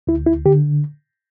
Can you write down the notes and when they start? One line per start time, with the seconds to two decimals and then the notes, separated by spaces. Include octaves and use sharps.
0.07 D2 E4
0.27 E4
0.46 D3 G4